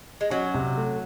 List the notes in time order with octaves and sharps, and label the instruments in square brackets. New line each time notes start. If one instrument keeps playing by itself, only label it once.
[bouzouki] G#3
[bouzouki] F#3 [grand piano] C#4
[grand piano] C3
A3